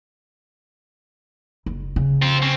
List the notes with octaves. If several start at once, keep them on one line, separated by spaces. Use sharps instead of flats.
F#1
C#3
C4 F4
C4 C#4